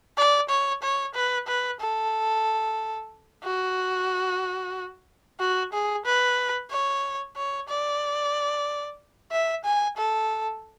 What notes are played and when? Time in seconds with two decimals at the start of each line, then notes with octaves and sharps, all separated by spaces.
0.17 D5
0.49 C#5
0.83 C#5
1.15 B4
1.47 B4
1.80 A4
3.43 F#4
5.40 F#4
5.73 G#4
6.05 B4
6.71 C#5
7.36 C#5
7.69 D5
9.31 E5
9.65 G#5
9.98 A4